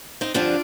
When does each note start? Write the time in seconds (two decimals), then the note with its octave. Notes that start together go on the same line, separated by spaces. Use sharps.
0.21 C4 D#4
0.34 G2 D3 F3 C4 D4 F4